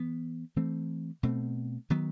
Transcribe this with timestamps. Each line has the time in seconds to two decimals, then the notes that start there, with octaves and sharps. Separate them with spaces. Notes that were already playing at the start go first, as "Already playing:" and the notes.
Already playing: E3 B3
0.56 E3 A3 C4
1.23 B2 A3 C4
1.90 D#3 F#3 B3